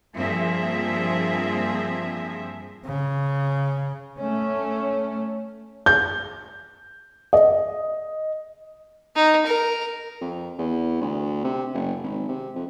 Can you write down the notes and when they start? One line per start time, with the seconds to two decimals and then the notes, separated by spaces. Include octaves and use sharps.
0.14 G2 F3 A#3 C4 G#4 E5
2.85 C#3
4.19 A3 C#4
5.86 G6
7.33 D#5
9.16 D#4
9.47 A#4
10.21 F2
10.58 E2
11.01 D2
11.44 C3
11.74 F#1
12.03 G#1
12.28 C3
12.55 F2